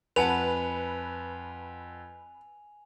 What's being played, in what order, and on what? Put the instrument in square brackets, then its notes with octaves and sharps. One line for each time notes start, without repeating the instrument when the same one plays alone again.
[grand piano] F2 F#5 A5 [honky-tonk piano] B4 [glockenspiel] G#5 F7